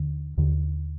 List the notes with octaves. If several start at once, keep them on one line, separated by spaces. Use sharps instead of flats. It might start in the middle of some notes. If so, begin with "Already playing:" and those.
Already playing: D#2 D3
D#2 D3